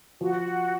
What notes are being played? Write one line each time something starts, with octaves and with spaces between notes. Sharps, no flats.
F3 F#4